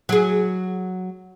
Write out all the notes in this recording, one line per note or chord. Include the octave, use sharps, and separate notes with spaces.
F#3 G#4